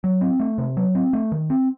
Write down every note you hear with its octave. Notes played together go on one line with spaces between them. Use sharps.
F#3
C4
A3
C3
F#3
C4
A3
D#3
C4